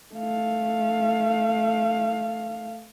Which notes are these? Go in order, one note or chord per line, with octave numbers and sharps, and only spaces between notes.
A3 F5